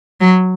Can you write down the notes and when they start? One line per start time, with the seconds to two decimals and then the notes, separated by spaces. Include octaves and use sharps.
0.21 F#3